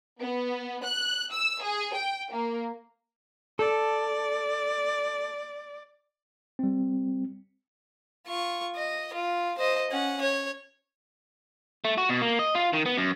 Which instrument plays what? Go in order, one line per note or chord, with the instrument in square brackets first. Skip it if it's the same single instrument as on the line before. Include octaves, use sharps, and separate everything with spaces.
[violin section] B3
F#6
E6
G#4
G5
A#3
[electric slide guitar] A4 [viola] D5
[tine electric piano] G3 C4
[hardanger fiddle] F4 C#6
D#5
F4
C5 D#5
C#4 F#5
C#5
[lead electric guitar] A3
F#4
B2
A#3
D#5
F4
D#3
B3
F#2